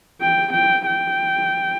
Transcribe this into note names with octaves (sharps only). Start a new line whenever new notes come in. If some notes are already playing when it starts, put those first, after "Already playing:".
G5
G5
G5